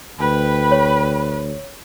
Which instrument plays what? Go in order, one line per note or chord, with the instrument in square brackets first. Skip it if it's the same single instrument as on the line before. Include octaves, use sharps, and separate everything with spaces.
[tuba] D2 [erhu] B4 [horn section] G5 B5
[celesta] C#5